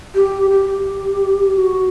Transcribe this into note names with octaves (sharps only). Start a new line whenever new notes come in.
G4
G4
F#4